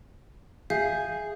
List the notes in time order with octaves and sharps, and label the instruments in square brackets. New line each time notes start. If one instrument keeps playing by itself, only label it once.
[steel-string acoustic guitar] G#4 [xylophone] E5 F5 G6